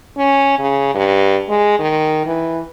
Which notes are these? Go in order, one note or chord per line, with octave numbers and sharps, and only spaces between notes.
C#4
C#3
G2
G#3
D#3
E3